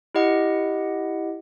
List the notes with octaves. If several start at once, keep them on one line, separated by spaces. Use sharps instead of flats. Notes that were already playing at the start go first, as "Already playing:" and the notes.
E4 G4 D#5 F#5